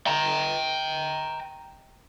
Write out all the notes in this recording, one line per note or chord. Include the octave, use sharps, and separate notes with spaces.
G5 A#5